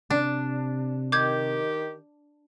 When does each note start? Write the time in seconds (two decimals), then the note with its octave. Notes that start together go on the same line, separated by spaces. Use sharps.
0.10 C3 D4
1.12 D#3 G4 D6 G6 G#6